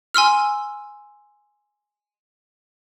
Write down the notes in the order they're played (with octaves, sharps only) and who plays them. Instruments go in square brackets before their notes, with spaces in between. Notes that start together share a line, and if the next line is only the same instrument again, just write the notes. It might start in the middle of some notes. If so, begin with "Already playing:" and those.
[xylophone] G#5 C6 E6 F6